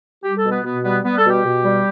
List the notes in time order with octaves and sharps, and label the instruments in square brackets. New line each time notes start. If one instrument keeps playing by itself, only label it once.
[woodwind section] G3 G4
A4
B2
B3
B2 B3
G3 B3
G3 B3
A4
B2
G4
B2
G3